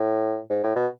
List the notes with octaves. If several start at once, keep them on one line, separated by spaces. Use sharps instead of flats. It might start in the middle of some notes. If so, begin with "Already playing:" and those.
Already playing: A2
G#2
A2
B2